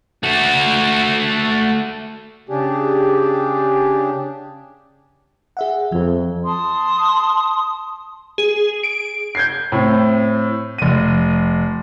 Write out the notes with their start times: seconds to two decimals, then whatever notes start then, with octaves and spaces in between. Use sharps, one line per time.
0.23 A3 F#4
2.49 C#3 D4 G4 G#4
5.57 G#4 E5 F#5
5.92 F2 F3
6.45 A5 C6 D#6
8.38 G#4
8.83 D7
9.35 G6 G#6 C7
9.72 A2 C4
10.78 F1 D#7